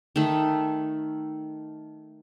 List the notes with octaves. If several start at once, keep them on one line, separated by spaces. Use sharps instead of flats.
D#3 A3